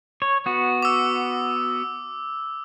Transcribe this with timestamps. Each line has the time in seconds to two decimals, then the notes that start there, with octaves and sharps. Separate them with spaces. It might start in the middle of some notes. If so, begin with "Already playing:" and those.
0.22 C#5
0.46 B3 F#4
0.82 D6 E6